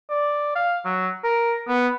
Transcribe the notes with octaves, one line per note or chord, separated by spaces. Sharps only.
D5
F5
F#3
A#4
B3